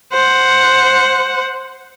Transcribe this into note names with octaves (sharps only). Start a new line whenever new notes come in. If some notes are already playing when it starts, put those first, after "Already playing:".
C5 F#5